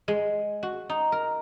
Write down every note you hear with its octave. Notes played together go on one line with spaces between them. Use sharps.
G#3
F#4
D#4
A#4